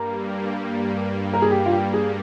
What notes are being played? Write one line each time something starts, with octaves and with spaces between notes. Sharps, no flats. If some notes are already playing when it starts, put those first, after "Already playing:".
Already playing: G2 G3 A#3 A#4
A#4
G#4
G4
F4
G4
G#4